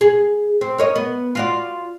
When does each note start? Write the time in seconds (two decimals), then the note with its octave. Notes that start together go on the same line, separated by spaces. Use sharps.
0.01 G#4
0.61 C4
0.78 A#4 C#5 D#5
0.96 B3
1.35 F4 F#4 D5